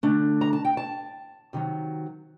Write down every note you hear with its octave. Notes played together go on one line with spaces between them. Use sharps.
D3 A3 D4
A#5
A5
G5
A5
C3 D#3 F#3